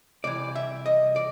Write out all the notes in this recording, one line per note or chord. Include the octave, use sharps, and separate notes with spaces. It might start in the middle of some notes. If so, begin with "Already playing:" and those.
C2 C3 E3 D5
E5
D#5
D5